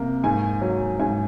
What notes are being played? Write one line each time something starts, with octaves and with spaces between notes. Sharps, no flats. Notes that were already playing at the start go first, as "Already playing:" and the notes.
Already playing: C3 A#3
G#2 G#5
F#3
G#2 G#5